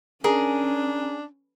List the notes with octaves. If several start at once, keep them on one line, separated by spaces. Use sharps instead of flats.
C#4 D4 G#4 A#4